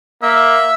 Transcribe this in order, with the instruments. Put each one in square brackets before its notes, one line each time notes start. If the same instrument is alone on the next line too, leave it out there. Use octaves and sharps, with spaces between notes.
[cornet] A#3 [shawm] E5